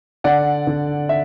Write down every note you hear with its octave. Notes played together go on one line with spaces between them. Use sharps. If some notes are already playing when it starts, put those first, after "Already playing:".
D3 D5 F#5
D3
E5